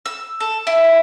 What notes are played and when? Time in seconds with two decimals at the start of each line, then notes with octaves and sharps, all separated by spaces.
0.06 E6
0.40 A4
0.67 E4